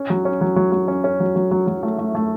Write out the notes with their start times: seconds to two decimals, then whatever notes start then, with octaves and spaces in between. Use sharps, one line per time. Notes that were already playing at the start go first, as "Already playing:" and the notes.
Already playing: C#4
0.10 F#3
0.25 C#4
0.41 F#3
0.56 F#3
0.72 F#3
0.88 C#4
1.04 C#4
1.20 F#3
1.36 F#3
1.51 F#3
1.67 F#3
1.83 A3
1.98 A3
2.15 A3